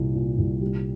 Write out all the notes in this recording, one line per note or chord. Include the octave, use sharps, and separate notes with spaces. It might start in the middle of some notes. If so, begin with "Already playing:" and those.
Already playing: C2 A#2
A#2
C2
G3